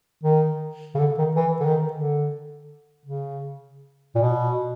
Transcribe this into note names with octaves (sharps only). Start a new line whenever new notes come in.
D#3
C#3
D3
D#3
E3
D3
D#3
D3
C#3
A#2
B2